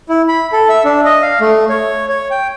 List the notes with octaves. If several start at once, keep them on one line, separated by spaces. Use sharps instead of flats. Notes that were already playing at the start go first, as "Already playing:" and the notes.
E4
B5
A4
E5
D4
D#5
F5
A3
C#5
C#5
G5